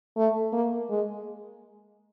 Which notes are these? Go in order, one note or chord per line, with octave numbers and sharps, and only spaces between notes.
A3
A#3
G#3